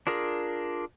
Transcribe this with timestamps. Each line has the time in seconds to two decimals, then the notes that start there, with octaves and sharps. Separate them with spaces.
0.07 D4 F4 G#4 A#4